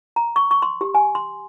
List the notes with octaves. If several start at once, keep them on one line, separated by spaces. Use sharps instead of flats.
A#5
C#6
C#6
C6
G4
G#5
C6